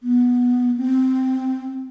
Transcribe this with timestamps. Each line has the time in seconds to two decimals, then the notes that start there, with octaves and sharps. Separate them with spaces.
0.03 B3
0.77 C4